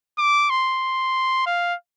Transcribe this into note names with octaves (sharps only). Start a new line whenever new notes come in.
D6
C6
F5